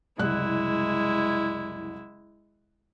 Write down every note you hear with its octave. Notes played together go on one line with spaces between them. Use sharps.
F#1 C2 G#3 E4 F#6